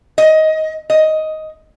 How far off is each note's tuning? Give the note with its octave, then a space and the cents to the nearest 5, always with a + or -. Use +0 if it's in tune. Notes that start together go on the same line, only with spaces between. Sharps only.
D#5 +15
D#5 +10